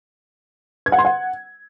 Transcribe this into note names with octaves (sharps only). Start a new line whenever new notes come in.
G#6
F#5
C6
F#5